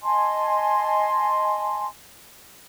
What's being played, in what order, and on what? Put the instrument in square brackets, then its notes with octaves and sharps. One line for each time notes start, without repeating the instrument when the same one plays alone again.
[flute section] D#5 G#5 A5 C6